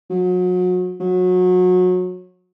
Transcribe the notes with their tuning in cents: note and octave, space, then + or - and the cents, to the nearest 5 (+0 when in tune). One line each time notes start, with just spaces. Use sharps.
F#3 -35
F#3 -25